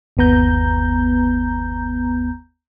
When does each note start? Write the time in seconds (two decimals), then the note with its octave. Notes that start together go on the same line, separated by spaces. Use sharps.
0.17 G1 D#2 B3 A#5 G6